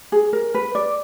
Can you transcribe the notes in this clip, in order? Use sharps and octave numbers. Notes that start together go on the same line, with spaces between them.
G#4
A#4
B4
D5